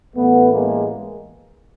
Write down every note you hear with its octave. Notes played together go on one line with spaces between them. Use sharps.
A1 A2 E3 A3 B3
G#3 A#3